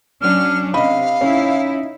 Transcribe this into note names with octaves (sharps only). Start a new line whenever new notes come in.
F#3 C#4 D4 F6
C3 D#5 F5 B5
C#4 D#4 E4